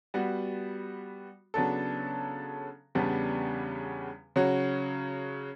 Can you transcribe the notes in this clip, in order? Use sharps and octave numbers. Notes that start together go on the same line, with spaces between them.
G3 B3 F#4
C#3 F#3 B3 D4 A4
E2 C#3 G3 B3 D4
C#3 F#3 C#4 F#4